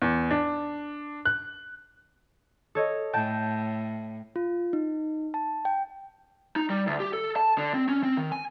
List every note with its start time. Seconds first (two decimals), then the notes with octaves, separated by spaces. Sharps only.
0.02 E2
0.31 D4
1.25 F#6
2.75 A4 C#5 D#5
3.13 A2 G5 A5 G6
4.36 F4
4.73 D#4
5.34 A5
5.65 G5
6.56 D#4
6.70 G3
6.87 D2
7.00 G4
7.13 A4
7.36 A5
7.58 D3
7.74 C4
7.89 C#4
8.03 C4
8.17 D#3
8.32 G#5